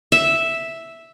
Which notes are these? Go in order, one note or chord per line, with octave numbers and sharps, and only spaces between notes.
E5